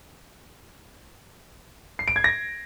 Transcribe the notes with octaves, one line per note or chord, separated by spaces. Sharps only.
C7
D7
G#6
A#6